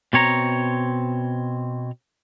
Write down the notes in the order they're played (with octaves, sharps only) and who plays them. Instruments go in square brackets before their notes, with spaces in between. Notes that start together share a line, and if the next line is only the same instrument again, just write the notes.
[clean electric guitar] B2 C4 C#5 A#5